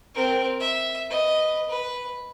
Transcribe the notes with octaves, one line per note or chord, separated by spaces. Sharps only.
C4 A#4
E5
B4 D#5
B4